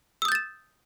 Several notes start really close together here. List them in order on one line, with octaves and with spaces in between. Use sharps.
E6 D#6 G6 A6 E7